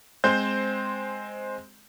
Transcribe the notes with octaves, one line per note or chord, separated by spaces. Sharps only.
G#3 C4 C5 G6